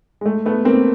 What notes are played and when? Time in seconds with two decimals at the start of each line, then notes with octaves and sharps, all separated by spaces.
0.21 G#3
0.26 A3
0.46 A3 B3
0.65 A#3 C4